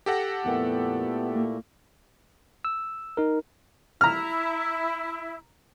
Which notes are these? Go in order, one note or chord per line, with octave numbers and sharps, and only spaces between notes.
G4 A4 F#5 A#6
F2 A#2 A3 B3 E4 A#4 G5
A#3
E6
D#4 A#4
E4 A#5 F6